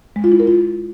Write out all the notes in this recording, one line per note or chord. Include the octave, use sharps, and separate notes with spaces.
G#3
F4
E4
A#4
F4